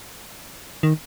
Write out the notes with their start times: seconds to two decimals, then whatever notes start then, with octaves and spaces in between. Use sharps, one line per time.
0.83 D#3